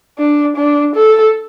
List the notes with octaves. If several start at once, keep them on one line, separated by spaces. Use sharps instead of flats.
D4
D4
A4